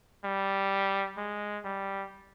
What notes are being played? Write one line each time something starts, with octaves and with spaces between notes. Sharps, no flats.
G3
G#3
G3